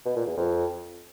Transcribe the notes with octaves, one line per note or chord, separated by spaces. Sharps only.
B2
A#2
E2
F2